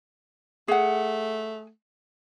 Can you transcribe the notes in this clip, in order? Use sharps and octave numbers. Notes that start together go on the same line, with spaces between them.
A3 G#4 F#5